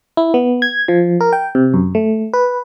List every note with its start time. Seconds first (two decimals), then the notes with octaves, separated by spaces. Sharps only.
0.17 E4
0.34 B3
0.62 G#6
0.88 F3
1.21 A#4
1.33 G5
1.55 C3
1.74 F#2
1.95 A3
2.33 B4